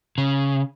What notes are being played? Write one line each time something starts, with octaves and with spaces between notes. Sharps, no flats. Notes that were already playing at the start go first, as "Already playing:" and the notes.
C#3